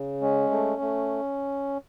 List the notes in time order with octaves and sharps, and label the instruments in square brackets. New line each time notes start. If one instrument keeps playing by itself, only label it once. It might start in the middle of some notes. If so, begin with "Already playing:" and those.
Already playing: [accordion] C#3
G#3 C#4
A3
A3